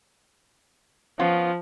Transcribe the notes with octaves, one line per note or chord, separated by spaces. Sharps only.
F3 B3 C#4 F4